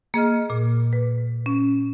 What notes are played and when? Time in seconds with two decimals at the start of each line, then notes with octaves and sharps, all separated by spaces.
0.14 A#3 G#4 D#5 F6
0.50 A#2 G#4
0.93 B4
1.46 C#4